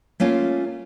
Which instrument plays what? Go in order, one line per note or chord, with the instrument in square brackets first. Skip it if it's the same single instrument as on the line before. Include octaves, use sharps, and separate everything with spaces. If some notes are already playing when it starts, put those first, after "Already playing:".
[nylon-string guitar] A3 A#3 C#4 F4